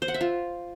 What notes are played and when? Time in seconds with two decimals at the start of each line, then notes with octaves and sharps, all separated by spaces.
0.02 C5
0.08 F#5
0.14 E5
0.21 F4